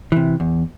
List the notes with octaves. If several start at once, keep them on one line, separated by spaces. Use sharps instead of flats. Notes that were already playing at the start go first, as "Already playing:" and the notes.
C3 E3
E2